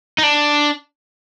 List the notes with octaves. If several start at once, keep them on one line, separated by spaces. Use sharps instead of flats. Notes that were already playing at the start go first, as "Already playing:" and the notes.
D#4
D4